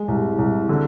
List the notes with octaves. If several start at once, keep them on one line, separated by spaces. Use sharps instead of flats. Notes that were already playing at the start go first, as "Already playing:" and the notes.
Already playing: G#3
C2
C2
D3